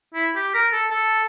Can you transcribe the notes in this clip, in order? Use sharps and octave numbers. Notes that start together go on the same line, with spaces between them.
E4
G4
A#4
A4
A4